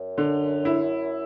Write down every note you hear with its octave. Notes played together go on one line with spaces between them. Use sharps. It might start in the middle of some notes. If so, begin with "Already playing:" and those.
Already playing: F#2
D3
E4